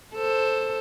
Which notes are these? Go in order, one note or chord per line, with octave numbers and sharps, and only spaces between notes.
A4 C5